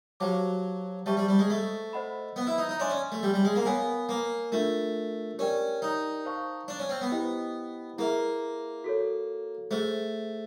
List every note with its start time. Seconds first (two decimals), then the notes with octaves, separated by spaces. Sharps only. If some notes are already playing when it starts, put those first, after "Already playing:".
0.20 F#3 G4 C5 F5 A5 D6
1.06 G3 C5 E5 A5 C#6
1.17 G3
1.28 G3
1.39 G#3
1.50 A3
1.93 C5 D#5 F#5 B5
2.36 B3
2.47 E4
2.58 D#4
2.69 D#4
2.79 D4 C#5 E5 G#5 C6
2.90 C#4
3.12 A3
3.23 G3
3.34 G3
3.45 G#3
3.56 A#3
3.66 B3 A#4 C#5 F5 G#5
4.09 A#3
4.52 A3 D4 F4 A#4
5.38 C#4 G4 A#4 D5 G5
5.82 D#4
6.25 C5 F5 A5 C#6
6.68 D4
6.79 C#4
6.89 C4
7.01 B3
7.12 E4 G4 C5 D#5 G5
7.98 A#3 E4 G#4 B4 E5
8.84 F#4 A4 C#5
9.71 A3 G#4 C5 E5